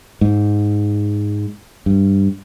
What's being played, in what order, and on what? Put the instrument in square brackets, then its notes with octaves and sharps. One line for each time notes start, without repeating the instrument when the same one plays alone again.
[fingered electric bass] G#2
G2